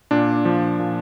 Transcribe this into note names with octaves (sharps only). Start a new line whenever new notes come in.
A#2 D4
F3
A#2